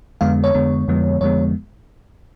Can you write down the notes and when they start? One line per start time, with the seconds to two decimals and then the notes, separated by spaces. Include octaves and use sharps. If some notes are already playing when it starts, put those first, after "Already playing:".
0.21 F2 D3 G#3 B3 F5
0.44 C#5
0.55 F2 D3 G#3 B3
0.88 F2 D3 F3 G#3 B3
1.21 F2 D3 F3 G#3 B3 C#5